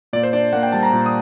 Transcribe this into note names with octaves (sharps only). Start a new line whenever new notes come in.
A#2 D5
C5
D4 D5
A#3 F#5
G5
G3 A5
A#5
A#2
D#6